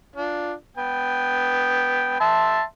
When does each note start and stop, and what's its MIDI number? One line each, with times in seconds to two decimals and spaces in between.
0.16 0.53 62
0.16 0.53 65
0.77 2.20 59
0.77 2.20 79
2.20 2.63 76
2.20 2.63 81
2.20 2.63 84